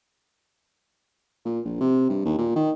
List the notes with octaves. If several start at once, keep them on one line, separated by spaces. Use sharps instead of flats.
A#2
A#1
C3
G2
D#2
A#2
D#3